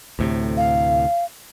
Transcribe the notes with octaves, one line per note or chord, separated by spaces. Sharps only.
D2 A2 C3
F5